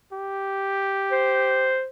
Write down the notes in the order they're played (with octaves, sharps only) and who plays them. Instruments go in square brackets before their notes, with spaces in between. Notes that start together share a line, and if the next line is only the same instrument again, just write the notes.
[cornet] G4
[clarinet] C5